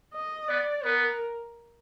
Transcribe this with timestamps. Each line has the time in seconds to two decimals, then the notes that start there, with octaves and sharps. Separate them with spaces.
0.14 D#5
0.49 B3 D5
0.85 B3 A#4